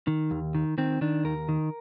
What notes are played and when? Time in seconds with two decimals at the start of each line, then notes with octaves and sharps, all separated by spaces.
0.07 D#3
0.31 D#2
0.55 D#3
0.78 D#3 C4
1.01 D#3 D4
1.25 D#2 A#4
1.49 D#3